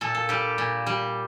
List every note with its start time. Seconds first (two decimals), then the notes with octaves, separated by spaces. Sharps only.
0.01 A#2 A4
0.15 A4
0.29 G3 G4
0.58 A#2
0.86 G3